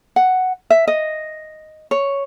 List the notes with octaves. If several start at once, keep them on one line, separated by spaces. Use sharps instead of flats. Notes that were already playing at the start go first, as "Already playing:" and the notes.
F#5
E5
D#5
C#5